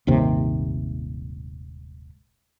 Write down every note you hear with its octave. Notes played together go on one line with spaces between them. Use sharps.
D#1 G#1 D#2 C3